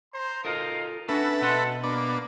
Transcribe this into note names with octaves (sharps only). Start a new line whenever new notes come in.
C5 A#5 C6
D#4 F4 A4 A#4 D#5 F5
C#4 D4 F#4 A4 B4 E5
B2 D#5 F#5 A5 C6
A#3 B3 D4